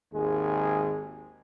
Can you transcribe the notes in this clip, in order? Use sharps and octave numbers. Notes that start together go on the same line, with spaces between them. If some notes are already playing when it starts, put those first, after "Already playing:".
G#1 D#2 G#3 G#4